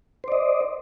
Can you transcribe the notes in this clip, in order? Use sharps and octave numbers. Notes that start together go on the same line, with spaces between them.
C5 D5 D#5